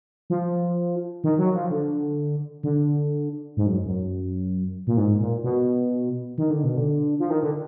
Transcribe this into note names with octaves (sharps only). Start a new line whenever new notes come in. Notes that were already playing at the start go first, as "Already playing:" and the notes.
F3
D#3
F#3
F3
D3
D3
G#2
F#2
F#2
A#2
G#2
A#2
B2
D#3
D3
B2
D3
F3
D#3
D3